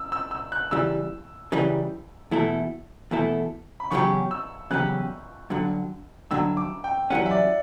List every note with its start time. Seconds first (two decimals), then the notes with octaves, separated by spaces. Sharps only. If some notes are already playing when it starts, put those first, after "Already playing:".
Already playing: E6
0.12 E6
0.31 E6
0.52 F#6
0.71 C#3 E3 G3 E6
1.52 C#3 E3 G3
2.31 E2 B2 A3 E4 A4
3.11 E2 B2 A3 E4 A4
3.80 B5
3.91 E2 C#3 F#3 C#4 G4 C#6
4.31 E6
4.71 E2 C#3 F#3 C#4 G4 F#6
5.50 G2 D3 F#3
6.31 G2 D3 F#3 E6
6.57 D6
6.84 G5
7.10 F#2 E3 G3 C#4 F#5
7.26 E5
7.31 D5